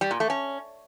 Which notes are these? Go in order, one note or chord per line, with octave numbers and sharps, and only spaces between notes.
G3
A#2
A3
C#4